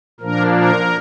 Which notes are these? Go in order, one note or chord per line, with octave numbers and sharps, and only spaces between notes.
A#2 F3 A#3 D4 A#4
A#4